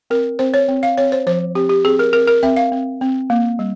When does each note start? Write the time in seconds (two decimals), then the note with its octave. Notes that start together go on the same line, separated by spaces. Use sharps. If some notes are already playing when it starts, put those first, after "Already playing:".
0.10 C4 A#4
0.39 C4 C5
0.54 C#5
0.68 C4
0.83 F5
0.98 C4 C#5
1.12 C5
1.27 F3 C5
1.55 C4 G4
1.69 G4
1.85 C4 G#4
1.99 A#4
2.13 C4 A#4
2.28 A#4
2.43 C4 E5
2.56 F5
2.72 C4
3.01 C4
3.30 A#3
3.59 G3